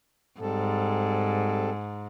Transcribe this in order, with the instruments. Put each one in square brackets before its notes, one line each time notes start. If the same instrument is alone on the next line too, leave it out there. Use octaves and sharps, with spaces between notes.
[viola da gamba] G#2 [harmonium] G3 C4 A4